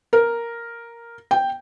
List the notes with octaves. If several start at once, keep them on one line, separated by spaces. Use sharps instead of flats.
A#4
G5